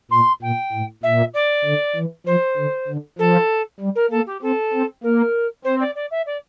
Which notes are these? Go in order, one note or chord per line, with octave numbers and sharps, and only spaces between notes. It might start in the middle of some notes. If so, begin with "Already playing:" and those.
A#2 C6
A#2 G5
A2
A#2 E5
D5
D3
E3
F3 C5
D3
D3
F3 A4
G3
A#4
A#3 A4
G4
C4 A4
C4
A#3 A#4
C4 C5
D5
D5
E5
D5